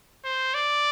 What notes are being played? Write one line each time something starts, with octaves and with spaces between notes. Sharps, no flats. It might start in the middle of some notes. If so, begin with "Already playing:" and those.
C5
D5